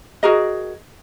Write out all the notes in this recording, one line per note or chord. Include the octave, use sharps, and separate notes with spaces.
F#4 G#4 A#4 D#5